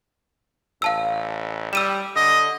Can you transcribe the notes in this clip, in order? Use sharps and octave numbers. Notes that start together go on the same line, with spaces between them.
A1 F5 A5 E6
G3 E6 D#7 E7
D3 D#5